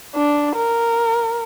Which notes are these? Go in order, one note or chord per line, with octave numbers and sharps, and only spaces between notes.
D4
A#4